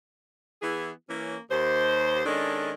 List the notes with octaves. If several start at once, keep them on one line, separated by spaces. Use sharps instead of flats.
E3 B3 E4 G#4
E3 A#3 C#4
D#2 C5
D#3 G#3 C#4 D4 A4